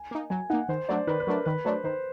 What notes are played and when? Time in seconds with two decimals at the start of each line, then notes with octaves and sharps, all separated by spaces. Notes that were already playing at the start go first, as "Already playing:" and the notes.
Already playing: G#5
0.11 A#3 D#4
0.30 F#3 G#5
0.50 A#3 D#4 F#5
0.69 D#3 C5
0.89 F#3 A3 D4 D5
1.07 D#3 B4
1.20 B4
1.27 F#3 A3 D4 A#4
1.46 D#3 B4
1.65 F#3 A3 D4 C5
1.84 D#3 C5